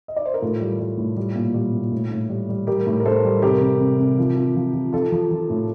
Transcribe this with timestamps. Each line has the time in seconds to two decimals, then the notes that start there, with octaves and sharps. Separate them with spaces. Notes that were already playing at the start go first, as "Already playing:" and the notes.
0.08 D#5
0.16 D5
0.26 C5
0.34 A#4
0.42 A2 F4 A4
0.61 G3
0.79 G3
0.98 A2
1.17 G3
1.36 A#2
1.54 G3
1.73 A#2
1.92 A2
2.11 A2
2.29 G3
2.49 G3
2.67 G3 G4 A#4
2.87 A2
3.00 A#4
3.05 A2 A4 C5
3.24 G3
3.38 A4
3.42 C3 G4 A#4
3.61 C3
3.80 C3
3.98 C3
4.18 F3
4.36 F3
4.56 F3
4.74 F3
4.92 F3 F4 A4
5.12 F3
5.31 F3
5.50 A2